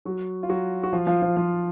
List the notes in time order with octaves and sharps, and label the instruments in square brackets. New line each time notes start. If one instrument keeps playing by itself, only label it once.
[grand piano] F#3 F#4
F4
F#3 F#4
F#4
F3 F4
F3 F4
F3 F4
F3 F4